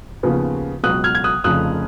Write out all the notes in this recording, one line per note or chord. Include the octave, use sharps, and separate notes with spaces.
D#2 C#3 F3 B3 F4
C#2 B2 F#3 D#6 F#6
F6 G#6
G#6
D#6 F#6
F1 F2 C#3 F3 D#6 F#6